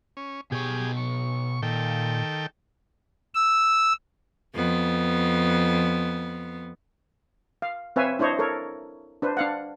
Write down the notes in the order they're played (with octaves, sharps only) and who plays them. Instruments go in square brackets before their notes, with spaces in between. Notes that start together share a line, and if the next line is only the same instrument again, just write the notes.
[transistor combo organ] C#4
[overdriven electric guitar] B2 C#5 [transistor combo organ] G4 G#4
[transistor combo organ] C#6
[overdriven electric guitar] A#2 [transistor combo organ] D#3 A4 G5
[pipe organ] E6
[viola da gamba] F2 B3
[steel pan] F5
C4 B4 C#5 E5 F5 G#5
D4 E4 C5 C#5 D#5
A4 A#4 C#5
D4 B4 C5
D4 F5 F#5